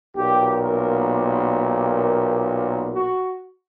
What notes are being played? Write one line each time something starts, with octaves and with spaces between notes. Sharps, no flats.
B1 A#2 A#3 G4
A#4
G4
F#4